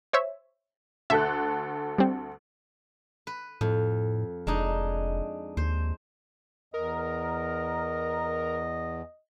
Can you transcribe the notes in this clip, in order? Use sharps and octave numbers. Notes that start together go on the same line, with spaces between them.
C5 C#5 E5
D2 A4 E5 F#6
G3 C4
B4
F2 A2
F1 G#3 D4 D#4
D#2 C5
E2 A#4 D#5